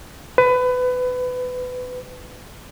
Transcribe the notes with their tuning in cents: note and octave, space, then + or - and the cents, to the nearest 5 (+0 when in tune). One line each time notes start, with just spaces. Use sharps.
B4 +25